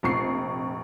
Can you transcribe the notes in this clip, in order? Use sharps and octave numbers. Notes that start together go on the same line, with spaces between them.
F1 A#1 C#6 C7